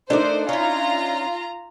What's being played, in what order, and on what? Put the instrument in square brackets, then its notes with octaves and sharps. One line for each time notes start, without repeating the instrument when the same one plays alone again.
[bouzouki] A3 A#4 D5 [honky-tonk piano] D4 D#4 [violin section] C5
[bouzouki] C#4 E4 [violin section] F4 A#5